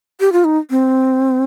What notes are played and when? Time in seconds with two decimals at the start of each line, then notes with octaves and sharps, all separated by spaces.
0.20 G4
0.32 F4
0.45 D#4
0.70 C4